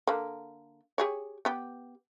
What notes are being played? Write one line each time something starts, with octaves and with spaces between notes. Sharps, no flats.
D3 A#3
G4 G#4 C#5
B3 G4